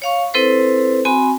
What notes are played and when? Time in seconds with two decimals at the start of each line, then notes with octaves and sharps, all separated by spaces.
0.02 C#5 F5 C#6
0.34 C4 E4 A4 B4 C5
1.05 C4 F#4 G#5 B5